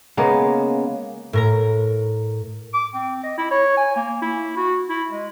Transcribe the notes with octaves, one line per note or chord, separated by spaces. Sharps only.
C#3 G#3 A#3 B3
A2 A#4 A#5
D6
C4
D#5
E4
C#5
G#5
A#3
E4
F#4
E4
G#3